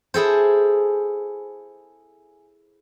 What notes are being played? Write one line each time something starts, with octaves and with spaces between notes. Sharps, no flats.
E4 G#4 A4 C5